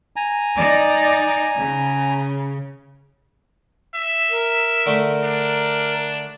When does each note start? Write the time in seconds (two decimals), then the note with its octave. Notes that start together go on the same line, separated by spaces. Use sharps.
0.16 G#5 A#5
0.55 D#4 D5
1.58 C#3
3.95 E5
4.31 A#4
4.86 D3 A3
5.24 D4